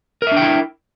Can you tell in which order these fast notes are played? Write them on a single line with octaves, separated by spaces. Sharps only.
A#4 E5 D4 G5 E4